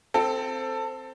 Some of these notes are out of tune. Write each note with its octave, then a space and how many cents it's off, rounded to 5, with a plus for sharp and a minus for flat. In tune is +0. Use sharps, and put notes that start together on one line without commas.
C4 +0 A4 +15